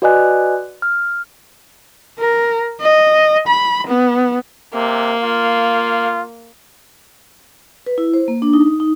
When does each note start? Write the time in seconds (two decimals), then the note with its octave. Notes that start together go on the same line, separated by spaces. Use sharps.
0.02 F#4 B4 D5 D#5 G#5 F#6
0.82 F6
2.19 A#4
2.80 D#5
3.48 B5
3.87 B3
4.74 C3 A#3
5.23 F4
7.86 B4
7.98 E4
8.14 C5
8.28 A#3
8.42 D4
8.53 D#4
8.80 D#4